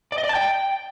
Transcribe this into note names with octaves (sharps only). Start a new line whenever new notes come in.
D5
D#5
D5
A5
G5